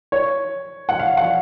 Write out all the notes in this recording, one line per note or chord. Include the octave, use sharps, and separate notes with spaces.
C#5
F#5
F5
F#5